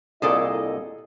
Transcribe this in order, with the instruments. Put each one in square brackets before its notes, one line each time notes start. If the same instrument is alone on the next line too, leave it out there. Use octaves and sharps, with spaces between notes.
[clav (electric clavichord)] C2 A#2 [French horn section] D3 E4 D#5 [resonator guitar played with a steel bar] G#4 A4 D5